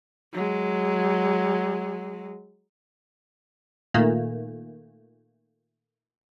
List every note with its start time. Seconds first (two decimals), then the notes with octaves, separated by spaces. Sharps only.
0.33 F#3 G#3
3.94 A#2 D#3 A3 A#3